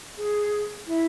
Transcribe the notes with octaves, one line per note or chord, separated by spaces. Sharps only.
G#4
E4